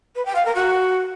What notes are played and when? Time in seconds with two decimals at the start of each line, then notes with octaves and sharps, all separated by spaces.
0.15 B4
0.25 G5
0.35 F5
0.45 A#4
0.55 F#4